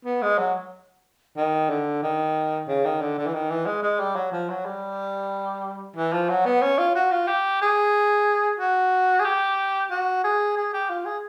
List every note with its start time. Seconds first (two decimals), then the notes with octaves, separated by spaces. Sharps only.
0.05 B3
0.22 G#3
0.38 F#3
1.37 D#3
1.70 D3
2.03 D#3
2.68 C#3
2.85 D#3
3.02 D3
3.18 D3
3.27 E3
3.34 D#3
3.50 E3
3.66 G#3
3.83 G#3
4.00 G3
4.16 F#3
4.32 F3
4.49 F#3
4.65 G3
5.96 E3
6.13 F3
6.29 F#3
6.45 B3
6.62 C#4
6.79 F4
6.95 F#4
7.12 F4
7.28 G4
7.62 G#4
8.60 F#4
9.20 G#4
9.25 G4
9.91 F#4
10.24 G#4
10.57 G#4
10.74 G4
10.90 F4
11.05 G#4